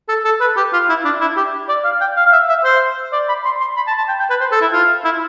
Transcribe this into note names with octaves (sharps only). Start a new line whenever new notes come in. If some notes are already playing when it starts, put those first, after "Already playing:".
A4
A4
B4
G4
F4
E4
D4
E4
G4
D5
F5
G5
F5
F5
E5
E5
C5
D5
B5
C6
C6
B5
A5
A5
G5
G5
B4
C5
A4
E4
F4
E4